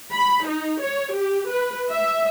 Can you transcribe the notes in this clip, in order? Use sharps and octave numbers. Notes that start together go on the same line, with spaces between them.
B5
D#4
C#5
G4
B4
E5